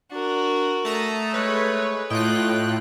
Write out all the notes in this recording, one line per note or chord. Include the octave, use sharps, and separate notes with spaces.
D4 F#4 A#4
A3 A5 A#5 D#6
G#3 B4 C#5
A2 F4 D#5 G5 F#6